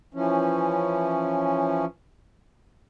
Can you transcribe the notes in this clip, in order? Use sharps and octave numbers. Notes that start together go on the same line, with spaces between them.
E3 F3 C#4